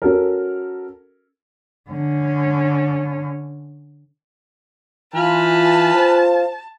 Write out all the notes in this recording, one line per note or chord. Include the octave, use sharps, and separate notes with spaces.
C#4 F#4 A4 A#4
D3 C#4
E3 F4 B4 G#5 A5 F6
C5